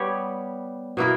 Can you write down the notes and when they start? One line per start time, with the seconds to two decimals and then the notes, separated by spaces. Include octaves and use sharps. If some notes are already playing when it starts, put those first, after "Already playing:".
Already playing: G3 B3 G4 C#5
0.97 B2 A#3 E4 A#4